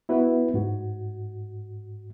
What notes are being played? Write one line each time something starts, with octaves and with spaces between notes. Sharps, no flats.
B3 E4 F#4 B4
G#2 F#4